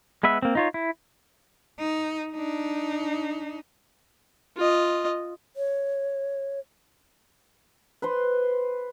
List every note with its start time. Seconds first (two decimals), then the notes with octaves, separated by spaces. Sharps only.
0.23 G#3 B3 B4 E5
0.42 A#3 C4
0.55 D#4 F4 C#5
0.74 E4
1.80 D#4
2.34 D4 D#4
4.57 F4 D#5
5.56 C#5
8.02 B4 C5 C6